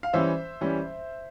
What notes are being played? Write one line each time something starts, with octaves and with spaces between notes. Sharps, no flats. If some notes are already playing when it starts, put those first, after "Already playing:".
F5
E3 G3 C#4 C5 E5
E3 G3 C#4